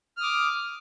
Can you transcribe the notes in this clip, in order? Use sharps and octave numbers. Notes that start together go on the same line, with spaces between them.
D6 D#6 F6